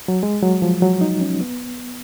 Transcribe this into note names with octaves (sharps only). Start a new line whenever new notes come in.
F#3
G#3
F#3
F3
F#3
D#4
C#4
B3